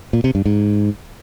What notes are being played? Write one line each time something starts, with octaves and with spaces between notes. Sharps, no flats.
A#2
C3
G2
G#2